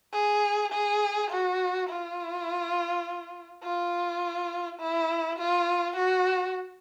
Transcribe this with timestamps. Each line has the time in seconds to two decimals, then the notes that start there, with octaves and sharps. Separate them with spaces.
0.13 G#4
0.72 G#4
1.31 F#4
1.89 F4
3.63 F4
4.80 E4
5.38 F4
5.96 F#4